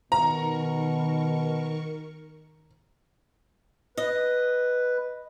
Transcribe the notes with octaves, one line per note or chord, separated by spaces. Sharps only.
B2 D#3 A#4 A#5 C#6
B4 D#5